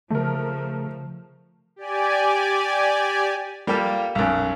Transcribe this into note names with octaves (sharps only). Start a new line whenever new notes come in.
C#3 F3 A3 A#4
G4 D5 G#5
G3 A#3 F4 G4 A4
B1 F#2